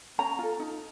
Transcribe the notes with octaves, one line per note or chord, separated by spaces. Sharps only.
C#4 A#5
F4 A4
D#4